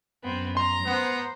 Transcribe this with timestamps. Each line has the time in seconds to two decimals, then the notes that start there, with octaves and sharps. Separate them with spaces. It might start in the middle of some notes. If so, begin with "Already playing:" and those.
0.24 F#2 B3 C4
0.57 A#5 C6
0.86 B3 C5